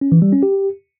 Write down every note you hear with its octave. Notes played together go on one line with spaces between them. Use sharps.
C#4
E3
G3
C#4
G4